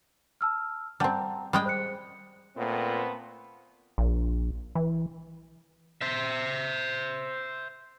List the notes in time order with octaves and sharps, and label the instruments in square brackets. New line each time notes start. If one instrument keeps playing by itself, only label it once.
[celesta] A5 E6 F6
[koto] G3 C4 [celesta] F#5 A5 A#5
[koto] G3 G#3 G5 [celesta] B5 D#6
[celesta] C5 F#6 C#7
[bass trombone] A#2 [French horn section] A3 B3 C4
[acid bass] A#1
E3
[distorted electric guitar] C5 E5